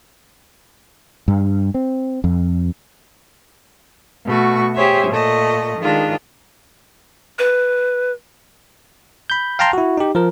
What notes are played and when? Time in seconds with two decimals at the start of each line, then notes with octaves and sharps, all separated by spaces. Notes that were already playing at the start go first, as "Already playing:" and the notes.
1.28 G2
1.74 C4
2.24 F2
4.25 B2 A3 F#4 C#6
4.74 G4 G#4 C5 C#5 E5
5.08 A#2 A3 D#5
5.80 D#3 G#3 D4 F4
7.39 B4
9.30 B5 G6
9.59 F5 G5 A5 A#5 C6 F6
9.73 E4 F#4
9.98 D#4 G4
10.15 F3 A#4